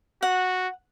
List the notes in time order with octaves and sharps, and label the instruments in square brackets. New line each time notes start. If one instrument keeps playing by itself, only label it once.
[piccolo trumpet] F#4 [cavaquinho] F#5